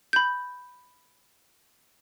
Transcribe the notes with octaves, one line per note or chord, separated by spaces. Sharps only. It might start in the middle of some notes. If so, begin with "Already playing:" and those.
B5 G6